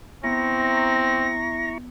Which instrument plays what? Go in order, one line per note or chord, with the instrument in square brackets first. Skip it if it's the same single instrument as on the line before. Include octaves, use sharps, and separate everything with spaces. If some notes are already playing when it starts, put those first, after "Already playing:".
[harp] B3 [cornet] C4 [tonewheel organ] E4 A#5 C#6 [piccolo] A#6